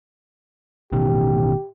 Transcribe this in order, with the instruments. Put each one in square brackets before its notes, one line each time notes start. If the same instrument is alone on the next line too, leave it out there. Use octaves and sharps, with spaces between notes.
[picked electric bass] A1 B2 D#3 [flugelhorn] G4